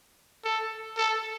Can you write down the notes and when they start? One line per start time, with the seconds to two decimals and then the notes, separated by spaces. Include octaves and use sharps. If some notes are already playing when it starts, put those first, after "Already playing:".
0.44 A4
0.97 A4